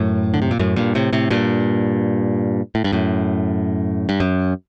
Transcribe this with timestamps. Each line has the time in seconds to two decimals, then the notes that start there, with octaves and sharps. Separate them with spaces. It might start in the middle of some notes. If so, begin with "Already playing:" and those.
Already playing: F#2 A2
0.34 D3
0.42 C3
0.51 A#2
0.59 F#2 A2
0.76 G2 A#2
0.95 A2 C3
1.13 A2 C3
1.31 G2 A#2
2.75 A2
2.84 G2
2.92 F#2 A2
4.09 G2
4.20 F#2